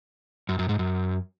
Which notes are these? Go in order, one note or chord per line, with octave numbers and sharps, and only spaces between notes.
F#2
F#2
G#2
F#2